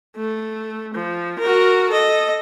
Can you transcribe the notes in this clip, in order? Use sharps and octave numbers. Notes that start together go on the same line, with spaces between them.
A3
F3
F#4 A#4
A4 D#5